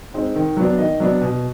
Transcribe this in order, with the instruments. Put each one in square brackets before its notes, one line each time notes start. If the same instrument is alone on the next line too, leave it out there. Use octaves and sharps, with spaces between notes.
[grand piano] G#3 C4 D#4
D#3
F#3 B3 D4
D#3 D#5
F#3 B3 D4
B2